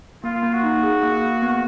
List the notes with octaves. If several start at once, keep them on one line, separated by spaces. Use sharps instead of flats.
A#3 F4
A#3
F#4
D#4
G#4
A#3
A#3
B3